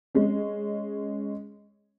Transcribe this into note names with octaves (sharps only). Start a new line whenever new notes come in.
G#3 C#4